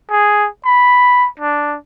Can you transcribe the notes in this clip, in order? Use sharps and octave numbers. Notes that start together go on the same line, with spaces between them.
G#4
B5
D4